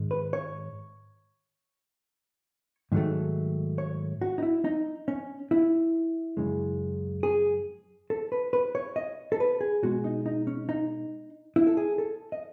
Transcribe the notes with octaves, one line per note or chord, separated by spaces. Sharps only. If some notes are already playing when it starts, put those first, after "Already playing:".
Already playing: G#2 D#3 G#3
B4
C#5
G#2 D#3 F#3 A3
C#5
F#4
D#4
E4
D#4
C#4
E4
F#2 C#3 G#3
G#4
A4
B4
B4
C#5
D#5
A4
B4
G#4
B2 G#3 F#4
D#4
D#4
C#4
D#4
E4
A4
G#4
A4
D#5